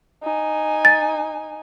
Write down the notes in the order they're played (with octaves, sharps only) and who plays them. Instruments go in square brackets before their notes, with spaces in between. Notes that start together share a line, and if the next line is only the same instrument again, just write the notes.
[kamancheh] D#4 G#5
[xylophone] A6